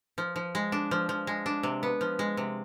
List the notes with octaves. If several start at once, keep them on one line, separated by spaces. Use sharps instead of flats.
F3
F3
G#3
D4
F3
F3
G#3
D4
C3
B3
F3
G#3
C3